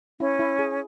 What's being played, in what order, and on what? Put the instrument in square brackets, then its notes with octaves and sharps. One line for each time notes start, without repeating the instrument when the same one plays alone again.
[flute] C#4 [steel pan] E4
[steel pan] E4
G#4